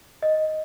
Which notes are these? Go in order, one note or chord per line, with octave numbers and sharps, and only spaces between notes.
D#5